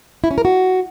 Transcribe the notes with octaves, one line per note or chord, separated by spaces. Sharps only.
E4
C#4
A#4
F#4